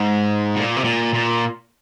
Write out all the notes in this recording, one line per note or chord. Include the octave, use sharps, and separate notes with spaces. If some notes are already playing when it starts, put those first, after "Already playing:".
Already playing: G#2
A#2
C3
A#2
A#2